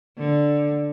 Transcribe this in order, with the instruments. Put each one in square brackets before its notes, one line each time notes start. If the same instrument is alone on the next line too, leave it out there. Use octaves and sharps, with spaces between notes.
[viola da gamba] D3